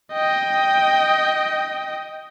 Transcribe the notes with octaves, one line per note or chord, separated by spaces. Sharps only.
D#5 G5